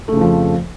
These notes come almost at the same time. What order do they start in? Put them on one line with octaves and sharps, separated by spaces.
A3 C#3 F2 F3